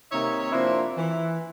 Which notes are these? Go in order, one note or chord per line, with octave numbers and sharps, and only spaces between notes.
C3 D#3 A#3 D#4 C#5 E5
F3 A#3 C4 D4 E4 C5
E3